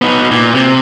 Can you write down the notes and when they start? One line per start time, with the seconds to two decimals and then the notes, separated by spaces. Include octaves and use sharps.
0.02 B3 D#4
0.31 A#2
0.55 C3